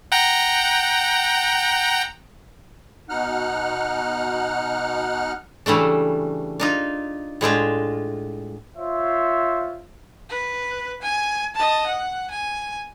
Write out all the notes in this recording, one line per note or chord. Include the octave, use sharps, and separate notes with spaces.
F#5 G5 A#5
B2 D#4 F#5 F6 F#6
C#3 E3 G3 A3 D4
D4 D#4 F4
A2 G#3 D4 F4
F4 C5 C#5 E5
B4
G#5
D#5 A5
F#5
G#5